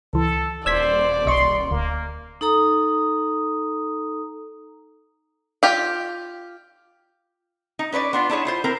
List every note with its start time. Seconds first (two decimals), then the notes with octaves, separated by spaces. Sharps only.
0.13 C#2 E3 A4
0.66 D#1 C5 D5 E6 G#6 B6
1.26 B1 D#5 C6 C#6
1.71 D2 A#3
2.41 D#4 A4 A#5 D#6
5.63 F4 G4 F5
7.79 D#4
7.92 C#4 B4 C#5 D5
8.13 B3 D4 F4
8.30 D4 E4 G#4 C#5
8.45 E4 F4 C5
8.64 C4 E4 A#4 C5